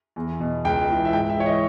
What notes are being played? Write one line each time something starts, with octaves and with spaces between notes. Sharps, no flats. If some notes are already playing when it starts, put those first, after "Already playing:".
E2
B2
C#2 G5
C#3 E3
E5
G#2 G5
E5
E3 C#5
D#5